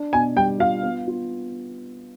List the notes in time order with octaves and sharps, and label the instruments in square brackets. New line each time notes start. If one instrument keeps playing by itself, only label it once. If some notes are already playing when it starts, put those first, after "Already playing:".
Already playing: [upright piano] D4
[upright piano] B2 [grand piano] G#5
[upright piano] G3 [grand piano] G5
[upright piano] F4 [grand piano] F5
[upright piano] B3
F4